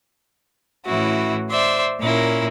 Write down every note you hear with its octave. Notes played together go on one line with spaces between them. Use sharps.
A2 E3 C#4 E4 F#4
C5 D5 E5 C6
A#2 C#4 E4 A#4